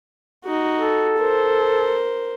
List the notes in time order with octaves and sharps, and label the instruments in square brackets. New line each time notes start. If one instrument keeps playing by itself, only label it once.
[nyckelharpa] D#4 F#4
[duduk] A4
[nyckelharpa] A#4 C5